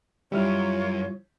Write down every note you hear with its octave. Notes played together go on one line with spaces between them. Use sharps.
F#2 G3 E4 F4 C#5 F6